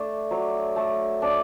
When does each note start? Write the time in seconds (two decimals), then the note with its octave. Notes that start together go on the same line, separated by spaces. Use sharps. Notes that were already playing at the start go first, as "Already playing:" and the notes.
Already playing: A3 D4
0.31 F#3
0.76 A3
1.22 D4